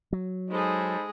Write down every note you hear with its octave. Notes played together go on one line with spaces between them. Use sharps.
F#3
G#3 D#4 G#4 A4 C5 B5